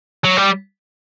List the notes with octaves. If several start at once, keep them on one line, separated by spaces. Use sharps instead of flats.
F#3
G3